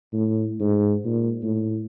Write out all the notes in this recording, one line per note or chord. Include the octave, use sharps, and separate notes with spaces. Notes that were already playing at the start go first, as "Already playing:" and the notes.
A2
G#2
A#2
A2